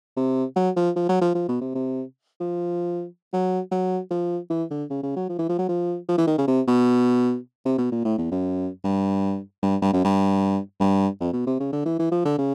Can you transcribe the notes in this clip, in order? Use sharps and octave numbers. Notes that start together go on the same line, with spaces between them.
C3
F#3
F3
F3
F#3
F3
F3
B2
C3
C3
F3
F#3
F#3
F3
E3
D3
C#3
C#3
F#3
F3
E3
F3
F#3
F3
F3
E3
D#3
C#3
C3
B2
C3
B2
A#2
A2
E2
F#2
G2
G2
G2
F#2
G2
G2
F2
B2
C3
C#3
D3
E3
E3
F3
D3
C#3